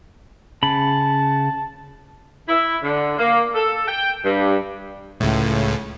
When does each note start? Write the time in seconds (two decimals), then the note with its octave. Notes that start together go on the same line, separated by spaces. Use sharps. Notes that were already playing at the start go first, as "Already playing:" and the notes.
0.63 C#3 A5 B5
2.49 E4
2.82 D3
3.18 A#3
3.54 A4
3.88 G5
4.24 G2
5.20 C#2 A2